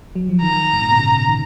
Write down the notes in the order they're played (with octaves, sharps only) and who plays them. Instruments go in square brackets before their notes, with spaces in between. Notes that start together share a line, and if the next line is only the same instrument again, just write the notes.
[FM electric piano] F#3
F3
[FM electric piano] D#3 [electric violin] A#5
[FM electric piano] G#2
A#2
B2
C#3
D#3